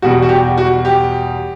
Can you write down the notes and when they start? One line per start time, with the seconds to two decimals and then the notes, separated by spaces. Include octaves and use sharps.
0.02 E2 B2 G3 F#4
0.22 F#4
0.29 G4
0.58 F#4
0.85 G4